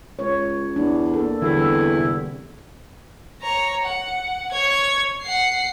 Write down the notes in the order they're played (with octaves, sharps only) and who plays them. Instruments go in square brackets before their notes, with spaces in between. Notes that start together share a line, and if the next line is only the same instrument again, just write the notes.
[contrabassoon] C#2 [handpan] C#5
[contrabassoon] E2 [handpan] D4
[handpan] A#3 A4
[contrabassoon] E2 [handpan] D3 E3 G3 [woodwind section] A3 C4 E4
[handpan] C3
[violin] C#5 A#5
F#5
C#5 G#6
F#5 C7